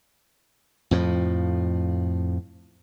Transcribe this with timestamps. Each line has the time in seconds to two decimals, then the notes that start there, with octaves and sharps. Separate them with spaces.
0.91 F2 A2 F3